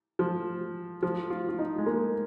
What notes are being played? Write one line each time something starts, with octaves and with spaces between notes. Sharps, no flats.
F3
F3
F4
F4
D#4
G#3
A#3